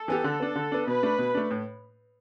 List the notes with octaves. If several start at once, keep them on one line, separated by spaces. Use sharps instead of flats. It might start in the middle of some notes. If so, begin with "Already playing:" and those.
Already playing: A4
E3 B3 G4
D3
B3 D4
D3
B3 D4
B2 B4
A3 D4
B2
A3 D4
A2